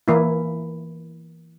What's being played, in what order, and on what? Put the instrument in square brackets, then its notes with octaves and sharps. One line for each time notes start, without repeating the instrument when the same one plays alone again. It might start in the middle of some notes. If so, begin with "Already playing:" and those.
[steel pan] E3 A#3 E4